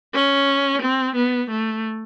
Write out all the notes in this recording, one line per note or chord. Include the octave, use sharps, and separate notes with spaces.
C#4
C4
B3
A3